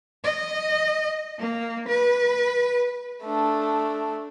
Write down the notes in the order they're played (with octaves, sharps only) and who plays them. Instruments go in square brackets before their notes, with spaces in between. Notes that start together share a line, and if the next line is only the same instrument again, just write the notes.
[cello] D#5
A#3
B4
[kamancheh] A3 D4